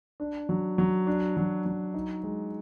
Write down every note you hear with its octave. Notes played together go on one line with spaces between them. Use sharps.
D4
F#3
F#3
D4
F#3
F#3
D#4
G#3